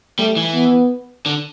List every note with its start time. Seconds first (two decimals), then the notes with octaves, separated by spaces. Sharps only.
0.19 G3 A3
0.36 E3
0.54 B3
1.26 D3